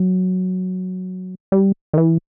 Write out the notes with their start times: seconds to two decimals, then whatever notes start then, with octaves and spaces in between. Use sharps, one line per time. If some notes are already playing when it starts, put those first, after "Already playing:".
Already playing: F#3
1.52 G3
1.93 D#3
1.98 E3